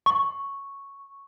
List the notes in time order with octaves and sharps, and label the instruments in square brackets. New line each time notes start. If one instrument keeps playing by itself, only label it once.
[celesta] C#6